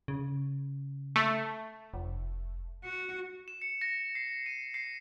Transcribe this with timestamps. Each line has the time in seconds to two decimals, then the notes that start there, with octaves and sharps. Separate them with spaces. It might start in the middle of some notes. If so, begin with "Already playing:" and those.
0.08 C#3
1.16 A3
1.94 F1
2.84 F#4
3.48 E7
3.62 C#7
3.81 A#6
4.15 C7
4.46 D#7
4.74 C7